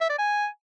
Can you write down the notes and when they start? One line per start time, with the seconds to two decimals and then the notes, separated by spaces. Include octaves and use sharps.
0.01 E5
0.09 D5
0.18 G#5